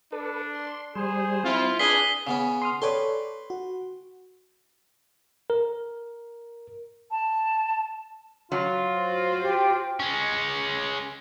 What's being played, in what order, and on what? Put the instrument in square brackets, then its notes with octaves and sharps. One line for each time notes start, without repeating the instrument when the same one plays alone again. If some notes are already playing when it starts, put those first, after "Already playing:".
[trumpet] D4 [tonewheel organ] A4 B4
[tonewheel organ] C6
[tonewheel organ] G3 C5 [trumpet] G#4
[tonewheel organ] C4 [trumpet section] E4 F4
[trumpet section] D4 G#4 [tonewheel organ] B4 D5 [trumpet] G#5 [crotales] B6 C7 G7
[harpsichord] C#3 B3 C#4
[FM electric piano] C6 D#6 F6
[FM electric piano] A4 C#5 D5 [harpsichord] B4 G5 C6
[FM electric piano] F#4
[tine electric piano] A#4
[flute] A5
[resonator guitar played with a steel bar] F#3 [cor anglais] F4
[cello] F#4 C5
[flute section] G4
[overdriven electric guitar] G#3 C#4